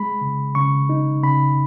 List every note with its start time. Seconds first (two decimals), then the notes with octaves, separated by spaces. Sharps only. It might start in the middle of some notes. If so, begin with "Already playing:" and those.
Already playing: G#3 B5
0.21 C#3
0.55 C#3 C#6
0.89 D#4
1.23 C#3 B5